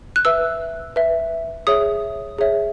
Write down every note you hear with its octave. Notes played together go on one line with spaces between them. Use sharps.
F#6
B4 E5 E6
B4 E5
G#4 C#5 E5 D#6
G#4 C#5 E5